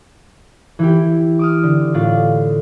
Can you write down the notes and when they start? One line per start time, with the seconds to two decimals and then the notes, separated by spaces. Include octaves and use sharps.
0.79 E3 E4 G4
1.39 D6 D#6 F6
1.63 D3
1.94 A2 D4 F4